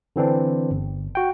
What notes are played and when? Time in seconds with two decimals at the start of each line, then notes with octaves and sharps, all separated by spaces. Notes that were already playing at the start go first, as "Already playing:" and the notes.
0.16 D3 E3 C4 D4
0.71 G1
1.15 F#4 G5